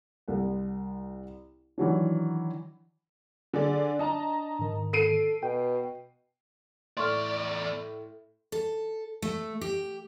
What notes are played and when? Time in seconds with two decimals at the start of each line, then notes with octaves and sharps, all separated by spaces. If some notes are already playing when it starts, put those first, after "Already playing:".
0.28 C2 F#5
1.78 D#3 E3 F#3 D4
3.54 D3 G#4 D5
3.99 D4 D#5 A5 A#5
4.59 G#2 D#3
4.93 A4 C7 D7 D#7
5.43 B2 G5
6.97 E2 A2 D5 C6 C#6 F6
8.52 A4
9.22 A3
9.61 G4